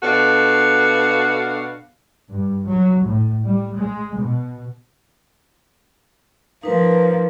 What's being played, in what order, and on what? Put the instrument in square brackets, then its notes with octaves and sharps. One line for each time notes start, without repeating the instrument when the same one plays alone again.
[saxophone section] B2 D4 F#4 A4 F5
[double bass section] G2
F#3
A2
G3
G#3
B2
[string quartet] F3 A#3 [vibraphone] D#4 B4